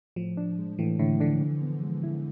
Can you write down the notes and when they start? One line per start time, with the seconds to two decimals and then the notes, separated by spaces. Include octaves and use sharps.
0.16 A2 F3
0.37 D4
0.59 G#3
0.79 A2 E3
0.99 A2 D3
1.21 D3 D4
1.41 E3
1.62 B3
1.83 G#3
2.04 E4